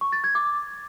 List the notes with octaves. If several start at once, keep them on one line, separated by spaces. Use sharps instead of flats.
C#6
A6
G#6
D6